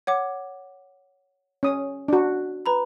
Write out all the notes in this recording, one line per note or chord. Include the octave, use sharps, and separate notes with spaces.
C#5 F#5 D6
C#4 D#6
D4 F#4
B4 A#5 B5